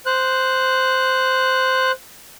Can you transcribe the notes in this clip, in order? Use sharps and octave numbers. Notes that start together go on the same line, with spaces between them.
C5 F#6